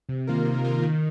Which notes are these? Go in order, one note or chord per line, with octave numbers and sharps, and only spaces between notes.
C3
D#3 A#3 F4 A#4
C3
D#3 A#3 F4 A#4
D#3